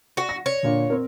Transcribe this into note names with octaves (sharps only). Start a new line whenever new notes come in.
F#4
A#6
C#5
A#2 D3
C4 A#4